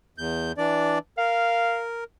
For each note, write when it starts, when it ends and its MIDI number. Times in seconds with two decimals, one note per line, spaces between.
0.18 0.52 40
0.18 0.52 91
0.58 0.98 52
0.58 0.98 62
0.58 0.98 74
1.18 2.04 70
1.18 1.82 77